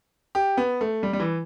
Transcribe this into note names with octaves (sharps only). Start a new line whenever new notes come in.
G4
B3
A3
G3
G3
E3